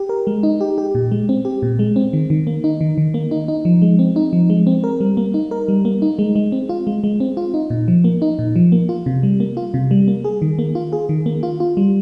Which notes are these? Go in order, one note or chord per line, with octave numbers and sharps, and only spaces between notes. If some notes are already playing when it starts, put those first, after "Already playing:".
Already playing: G4
A#4
G#3
D#4
G4
G4
A#2
G#3
C4
G4
A#2
G#3
C4
D#3
D#3
A#3
D#4
D#3
D#3
A#3
D#4
D#4
F3
G#3
C4
D#4
F3
G#3
C4
A#4
G3
A#3
D#4
A#4
G3
A#3
D#4
G#3
G#3
C4
F4
G#3
G#3
C4
F4
D#4
A#2
F3
A#3
D#4
A#2
F3
A#3
F4
C3
G3
A#3
F4
C3
G3
A#3
G#4
D#3
A#3
F4
G#4
D#3
A#3
F4
F4
G3